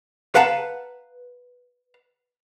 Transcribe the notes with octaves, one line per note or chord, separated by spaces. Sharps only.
B4 F5 F#5 A5 A#5